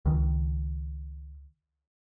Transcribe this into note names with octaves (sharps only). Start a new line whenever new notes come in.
C#2 D#3